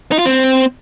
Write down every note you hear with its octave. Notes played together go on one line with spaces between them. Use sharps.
D#4
F4
C4